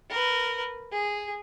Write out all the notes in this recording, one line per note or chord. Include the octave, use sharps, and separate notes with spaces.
A#4 B4
G#4